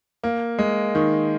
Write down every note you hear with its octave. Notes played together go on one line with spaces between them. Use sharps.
A#3
G#3
D#3